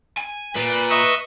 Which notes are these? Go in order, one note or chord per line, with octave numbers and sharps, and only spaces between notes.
G#5
A#2 B4
D#5 E5 C#6